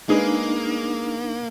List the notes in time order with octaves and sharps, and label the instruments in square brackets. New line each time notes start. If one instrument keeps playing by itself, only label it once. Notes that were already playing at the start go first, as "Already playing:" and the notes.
[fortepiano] G#3 G#4 B4 [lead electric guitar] A#3 [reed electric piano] D4 D#4